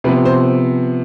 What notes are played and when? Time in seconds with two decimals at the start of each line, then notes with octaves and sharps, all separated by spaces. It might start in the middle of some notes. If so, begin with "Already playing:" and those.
0.04 C3 F3 B3 B4
0.25 C5